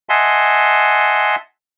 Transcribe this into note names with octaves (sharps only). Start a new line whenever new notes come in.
D#5 E5 F#5 G#5 A5 C6